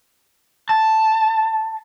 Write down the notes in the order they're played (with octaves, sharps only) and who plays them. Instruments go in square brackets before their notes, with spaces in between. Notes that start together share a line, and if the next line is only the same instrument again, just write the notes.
[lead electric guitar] A5